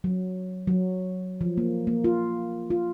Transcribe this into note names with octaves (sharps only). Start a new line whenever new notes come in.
F#3
F#3
F3
A#3
A#3
F4
F4